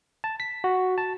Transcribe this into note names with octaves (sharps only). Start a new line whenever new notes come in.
A5
B6
F#4
A5